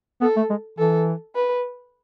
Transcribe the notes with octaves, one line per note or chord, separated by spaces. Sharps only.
B3 A4
A3
G#3
E3 A4
B4